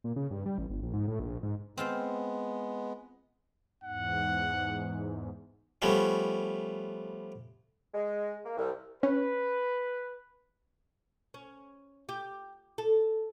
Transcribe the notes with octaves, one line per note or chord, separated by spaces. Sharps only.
A#2
C#3
G2
G3
A1
G1
A#1
G#2
A2
A#1
G#2
G#3 B3 C4 F4 C5
E2 G#2 F#5
F3 G3 A3 B3 C#4
G#3
A#3
C2
C#4 B4
C#4
G4
A4